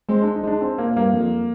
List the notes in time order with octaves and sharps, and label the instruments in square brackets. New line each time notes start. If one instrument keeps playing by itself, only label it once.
[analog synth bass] G#3 [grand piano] C4
[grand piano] D4
D#4
[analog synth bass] G#3 [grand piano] D4
[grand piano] C4
[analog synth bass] A#2 [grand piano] A#3
[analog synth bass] G2 [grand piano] A#3
[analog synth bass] F2